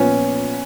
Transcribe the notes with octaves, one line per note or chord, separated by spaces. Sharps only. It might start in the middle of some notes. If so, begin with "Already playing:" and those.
Already playing: A#2 F3 B3 C#4